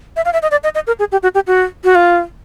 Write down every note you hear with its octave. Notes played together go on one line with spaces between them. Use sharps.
E5
F5
E5
D#5
D5
D#5
D#5
A#4
G#4
G4
F#4
G4
F#4
F#4
F4